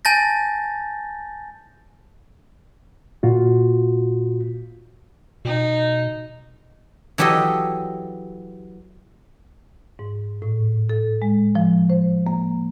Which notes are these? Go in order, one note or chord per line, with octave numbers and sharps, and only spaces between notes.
G#5 A5 G6 A6 A#6
A#2 F4 F#4
B2 D#4
E3 F#3 G4 A4 D#5
G#2
A2
A4
G#3
F3
C5
A#3